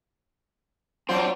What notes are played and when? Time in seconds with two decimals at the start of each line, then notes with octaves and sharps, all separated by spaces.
1.09 F#3 C4 D4 F4 C5